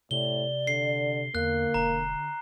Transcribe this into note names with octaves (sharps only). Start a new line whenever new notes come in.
A2 C3 D5 G7
D3 C7
E2 D3 A#3 F#6
E1 A#5